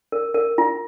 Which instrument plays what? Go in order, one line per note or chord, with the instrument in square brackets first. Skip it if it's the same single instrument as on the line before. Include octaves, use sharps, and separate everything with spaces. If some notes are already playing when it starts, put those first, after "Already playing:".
[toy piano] A#4
A#4
F4